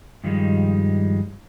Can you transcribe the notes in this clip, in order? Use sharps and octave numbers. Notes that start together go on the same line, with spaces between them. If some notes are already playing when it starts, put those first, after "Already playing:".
G2 D#3 F3 G3 G#3